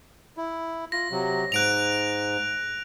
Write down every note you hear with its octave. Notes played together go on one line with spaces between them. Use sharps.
E4
F4 A#6
C3 F#3
G#2 F#6 D7 F7